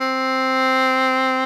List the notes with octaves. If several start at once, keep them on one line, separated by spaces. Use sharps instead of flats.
C4